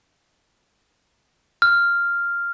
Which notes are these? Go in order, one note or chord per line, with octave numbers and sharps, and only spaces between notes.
F6